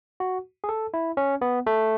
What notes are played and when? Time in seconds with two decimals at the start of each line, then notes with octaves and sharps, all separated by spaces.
0.20 F#4
0.64 G#4
0.69 A4
0.94 E4
1.17 C#4
1.41 B3
1.66 A3